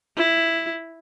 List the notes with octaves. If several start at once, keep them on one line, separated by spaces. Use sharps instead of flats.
E4